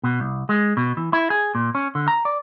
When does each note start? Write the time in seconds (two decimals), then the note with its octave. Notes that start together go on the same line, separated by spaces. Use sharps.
0.04 B2
0.20 C2
0.49 G#3
0.77 B2
0.97 E3
1.13 E4
1.30 G#4
1.55 A#2
1.75 C#4
1.95 D3
2.08 A#5
2.25 D5